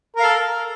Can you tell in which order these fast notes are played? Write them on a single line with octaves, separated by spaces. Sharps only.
A#4 F5 A4